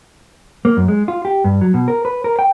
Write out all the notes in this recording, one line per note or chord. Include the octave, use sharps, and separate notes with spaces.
A#3
F#2
G#3
F4
G4
G2
F#3
B2
A#4
B4
A#4
G5